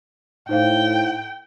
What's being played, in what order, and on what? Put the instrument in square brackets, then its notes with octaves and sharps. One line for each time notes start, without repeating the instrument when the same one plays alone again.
[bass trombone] A2 [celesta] D#4 C5 F5 [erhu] G5